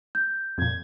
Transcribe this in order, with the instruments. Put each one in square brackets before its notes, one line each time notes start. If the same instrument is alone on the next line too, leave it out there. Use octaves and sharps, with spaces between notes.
[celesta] G6
[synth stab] F2 A#2 [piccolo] G#6